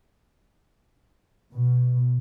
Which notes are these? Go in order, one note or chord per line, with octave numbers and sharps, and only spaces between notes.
B2